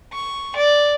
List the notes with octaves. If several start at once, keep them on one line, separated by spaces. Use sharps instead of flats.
C#6
D5